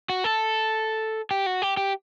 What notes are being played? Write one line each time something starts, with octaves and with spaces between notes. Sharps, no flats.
F#4
A4
G4
F#4
G4
G4